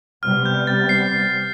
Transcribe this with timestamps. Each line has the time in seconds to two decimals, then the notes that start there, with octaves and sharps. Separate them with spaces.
0.23 C3 G3 B3 F6
0.46 G6
0.67 A6
0.89 C7